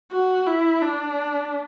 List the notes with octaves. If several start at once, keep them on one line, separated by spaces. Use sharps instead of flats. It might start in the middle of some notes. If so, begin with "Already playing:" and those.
F#4
E4
D4